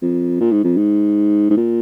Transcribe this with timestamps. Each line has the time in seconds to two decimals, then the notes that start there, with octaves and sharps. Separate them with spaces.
0.02 F2
0.40 A#2
0.52 G#2
0.64 F2
0.77 G#2
1.50 G#2
1.57 A#2